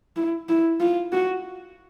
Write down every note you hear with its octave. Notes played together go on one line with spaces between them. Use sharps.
E4
E4
F4
F#4